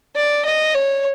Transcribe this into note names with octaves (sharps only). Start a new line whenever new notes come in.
D5
D#5
C#5